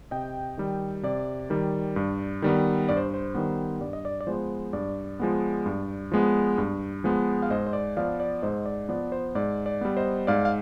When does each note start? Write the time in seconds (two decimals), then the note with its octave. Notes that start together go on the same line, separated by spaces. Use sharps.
0.11 C3 D#5 G5
0.57 D#3 G3
1.03 C3 D5
1.50 D#3 G3
1.96 G2
2.42 D#3 G3 B3
2.89 G2 D5
2.97 C5
3.14 C5
3.35 D#3 G3 B3
3.80 G2 D5
3.93 D#5
4.05 D5
4.21 D5
4.27 F3 G#3 B3 C5
4.73 G2 D5
5.20 F3 G#3 B3
5.66 G2
6.12 F3 G#3 B3
6.58 G2
7.04 F3 G#3 B3
7.42 F5
7.50 G#2 C5 D#5
7.67 C5
7.73 D5
7.97 F3 B3 D5 F5
8.20 D5
8.42 G#2 C5 D#5
8.66 D5
8.89 F3 B3 D5
9.12 C5
9.35 G#2 D5
9.66 D5
9.81 G3 B3
9.97 C5 D#5
10.27 G#2 D5 F5
10.45 F5